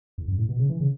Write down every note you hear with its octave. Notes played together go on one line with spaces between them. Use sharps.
E2
F#2
A2
B2
C#3
E3
C#3